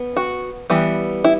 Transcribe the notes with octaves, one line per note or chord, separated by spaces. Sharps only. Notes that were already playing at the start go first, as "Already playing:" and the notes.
Already playing: B3
F#4
E3 G3 B3
E4